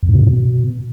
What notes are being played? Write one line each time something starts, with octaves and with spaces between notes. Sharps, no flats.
F2
A2
C3
G2
B2